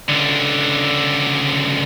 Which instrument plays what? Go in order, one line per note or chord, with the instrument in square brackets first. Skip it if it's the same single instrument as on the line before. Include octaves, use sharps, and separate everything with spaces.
[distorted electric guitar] C#2 D3